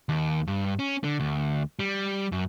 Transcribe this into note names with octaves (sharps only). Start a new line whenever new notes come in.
D#2
G2
C#4
D3
D2
G3
F#2